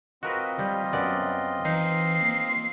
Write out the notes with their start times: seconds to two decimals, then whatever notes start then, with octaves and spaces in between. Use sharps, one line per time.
0.23 C4 F4 F#4 A#4 B4 D#5
0.59 G3
0.93 F#2 B3 D5
1.65 E3 D#4 C7
2.22 A#3